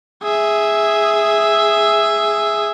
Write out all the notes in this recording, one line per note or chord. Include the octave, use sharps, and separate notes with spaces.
G#4 E5